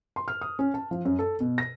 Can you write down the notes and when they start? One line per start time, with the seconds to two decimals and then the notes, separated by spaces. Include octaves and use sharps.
0.16 C6
0.28 F6
0.41 D#6
0.59 C#4
0.74 A5
0.91 F3
1.05 F#2
1.19 A4
1.40 B2
1.58 A#6